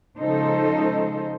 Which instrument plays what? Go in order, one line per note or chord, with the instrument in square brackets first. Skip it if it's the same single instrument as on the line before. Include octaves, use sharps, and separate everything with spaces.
[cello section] C#3 F3 G#3 D#4 A4 C5